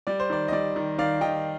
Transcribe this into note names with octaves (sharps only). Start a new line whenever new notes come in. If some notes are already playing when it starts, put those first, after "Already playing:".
G3 D5
C5
D#3 D5
D#5
G3 D5
D#3
D#3 D5 F5
D#3 D#5 G5